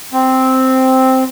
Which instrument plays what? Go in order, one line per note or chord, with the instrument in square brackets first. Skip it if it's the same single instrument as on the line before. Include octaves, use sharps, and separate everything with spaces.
[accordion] C4